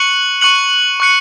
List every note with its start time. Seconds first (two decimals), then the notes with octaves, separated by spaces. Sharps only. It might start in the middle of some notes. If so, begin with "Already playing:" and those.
Already playing: C#6 F#6 C#7 F#7
0.41 C#6 F#6 C#7 F#7
1.00 C#6 F#6 C#7